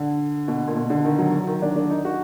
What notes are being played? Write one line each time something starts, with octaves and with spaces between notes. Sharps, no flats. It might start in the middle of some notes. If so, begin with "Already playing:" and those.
Already playing: D3
B2
A#2
B2
D3
D#3
F#3
F#3
D#3
D4
D4
D#4
F#4